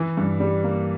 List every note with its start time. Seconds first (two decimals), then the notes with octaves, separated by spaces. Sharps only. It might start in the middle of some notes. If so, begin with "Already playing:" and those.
Already playing: E3
0.17 G2
0.40 G3
0.64 A#3